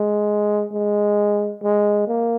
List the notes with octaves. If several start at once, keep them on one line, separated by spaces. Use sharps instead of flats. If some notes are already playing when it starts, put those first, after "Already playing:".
Already playing: G#3
G#3
G#3
A#3